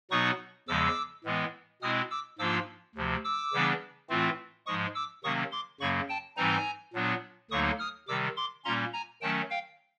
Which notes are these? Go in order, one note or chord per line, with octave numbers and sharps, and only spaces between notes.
B2 F#3 B3 D#4 C#6 D#6
E2 C#3 F3 G#3 D6 E6
A2 E3 G#3 B3
B2 G#3 C4 E4 D#6 F6
D6 E6
G#2 F3 A#3 D4 F4 D6 E6
D2 C3 F3
D6 E6
C#3 E3 G3 B3 D4
A2 E3 A3 C4 F4
G#2 F3 G#3 C#6 D#6
D6 E6
C3 D#3 F#3 A#3 C#4 C#6 D#6
C6 D6
F#2 C#3 F#3 A#3 B5 C#6
G5 A5
G#2 E3 G3 C4 D#4 G#5 A#5
A#2 F#3 B3 D4
D2 D3 F#3 A#3 D#4 C#6 D#6
D#6 F6
C3 D#3 G3 D6 E6
C6 D6
A#2 G3 A#3 C#4 A#5 C6
G#5 A#5
D#3 F#3 A3 C#4 G5 A5
F5 G5